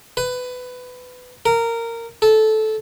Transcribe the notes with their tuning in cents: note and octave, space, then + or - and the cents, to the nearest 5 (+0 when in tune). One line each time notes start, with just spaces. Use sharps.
B4 +15
A#4 -15
A4 -15